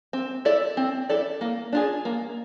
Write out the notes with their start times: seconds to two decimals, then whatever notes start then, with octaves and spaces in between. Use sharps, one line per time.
0.13 C4
0.45 E4 A4 D5
0.77 C4
1.09 E4 A4 D5
1.41 A#3
1.73 D4 F4 G#4
2.05 A#3